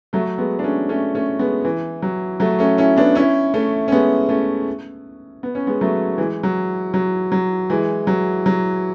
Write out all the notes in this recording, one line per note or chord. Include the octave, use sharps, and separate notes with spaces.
F#3 A3
G#3 B3
D4
A3 C#4
A3 C#4
A3 C#4
G#3 B3
E3
F#3
F#3 A3
A3 C#4
C#4 E4
B3 D4
C#4 E4
A3 C#4
C#4
G#3 B3
A3 C#4
B3
C#4
G#3 B3
F#3 A3
E3 G#3
F#3
F#3
F#3
E3 G#3
F#3
F#3